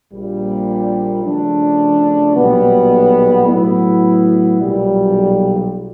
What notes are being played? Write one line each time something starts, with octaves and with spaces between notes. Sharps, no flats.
A#1 A#2 G3
C#3 F3 A3 D4
B1 A#2 G3 B3
A2 F#3 B3 E4
B1 A#2 G3